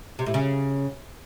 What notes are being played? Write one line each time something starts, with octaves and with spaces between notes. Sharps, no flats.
C3
A2
C#3